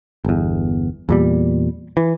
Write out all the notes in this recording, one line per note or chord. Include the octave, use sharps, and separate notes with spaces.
G1 E2
E2 A#2 G3
E3